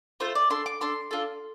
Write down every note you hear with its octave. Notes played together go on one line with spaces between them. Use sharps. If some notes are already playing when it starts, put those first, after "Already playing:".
A3 F4 A4 C5
D5
D4 A4 C6
D6
D4 A4 C6
D4 F4 A4